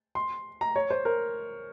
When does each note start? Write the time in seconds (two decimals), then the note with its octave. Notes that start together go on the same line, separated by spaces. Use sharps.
0.15 C6
0.61 A#5
0.76 C#5
0.90 C5
1.05 A#4